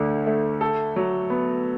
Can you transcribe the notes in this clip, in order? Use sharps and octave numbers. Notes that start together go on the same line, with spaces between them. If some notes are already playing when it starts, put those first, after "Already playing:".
Already playing: D2 D3
A3
A4
F#3
B3